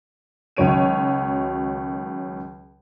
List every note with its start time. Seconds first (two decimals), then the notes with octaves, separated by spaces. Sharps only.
0.57 C#2 D#3 F#3 C#5 D7 D#7